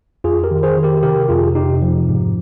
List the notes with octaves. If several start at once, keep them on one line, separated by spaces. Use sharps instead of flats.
F2 F4 G#4
G4 A#4
D#3
G#4 C5
D#3
G4 A#4
C3 G4 A#4
F2 F4 G#4
C3 D#4 G4
F3
G#2